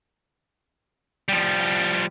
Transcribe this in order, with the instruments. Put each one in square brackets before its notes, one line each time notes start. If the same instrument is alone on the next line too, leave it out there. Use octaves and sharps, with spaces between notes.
[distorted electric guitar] F3 G3